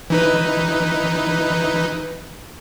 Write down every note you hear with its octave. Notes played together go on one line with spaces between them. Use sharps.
E3 D#4 B4